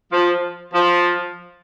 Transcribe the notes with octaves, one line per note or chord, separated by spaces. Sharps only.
F3
F3